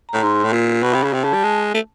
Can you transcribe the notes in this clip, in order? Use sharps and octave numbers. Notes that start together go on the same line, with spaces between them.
A#5
A2
G#2 C6
A2
A#2
B2 B5
C3
C#3
C3
C#3 A5
G3 A5
G#3
A3